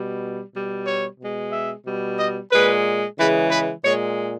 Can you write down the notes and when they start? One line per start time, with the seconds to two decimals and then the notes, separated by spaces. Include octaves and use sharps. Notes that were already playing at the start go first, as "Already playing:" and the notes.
Already playing: B2 G3
0.53 B2 G3
0.86 C#5
1.18 B2 G#3
1.52 E5
1.85 B2 G3
2.17 D#5
2.51 A#2 G#3 B4
3.17 C#3 E3 G#3 B4
3.50 B4
3.83 A#2 G#3 C#5